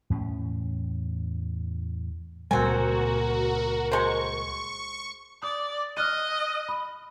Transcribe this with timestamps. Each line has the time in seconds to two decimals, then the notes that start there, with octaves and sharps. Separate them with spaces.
0.10 E2 A2 C#4
2.51 C#2 A#2 G3 C4 F#4 A#4 G#5
3.92 G#3 C5 C#6
5.43 D5 D#6
5.96 D#5 F6 F#6 D#7
6.68 B5